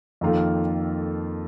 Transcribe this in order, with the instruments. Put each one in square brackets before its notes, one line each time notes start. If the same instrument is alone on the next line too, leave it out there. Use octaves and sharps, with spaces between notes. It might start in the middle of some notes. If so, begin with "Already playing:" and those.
[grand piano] F2 D#3 A#3 F4 A4